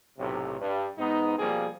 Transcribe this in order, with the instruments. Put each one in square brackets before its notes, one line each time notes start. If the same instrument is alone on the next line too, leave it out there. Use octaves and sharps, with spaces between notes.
[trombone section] B1 A2 C3
G2
G#2 B3 D#4
B2 F3 G3 A#3 C4 G#4